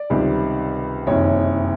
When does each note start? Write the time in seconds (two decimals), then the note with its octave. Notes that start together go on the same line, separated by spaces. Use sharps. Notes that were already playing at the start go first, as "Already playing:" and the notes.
Already playing: D5
0.10 C#2 C3 D#3 G3
1.07 F#1 F2 C3 D#3 C#5